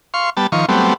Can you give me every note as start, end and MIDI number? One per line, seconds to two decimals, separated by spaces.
0.14 0.30 77
0.14 0.30 84
0.14 0.30 85
0.37 0.47 55
0.37 0.47 59
0.37 0.47 81
0.52 0.66 51
0.52 0.66 53
0.52 0.66 85
0.69 0.94 54
0.69 0.94 55
0.69 0.94 57
0.69 0.94 59
0.69 0.94 60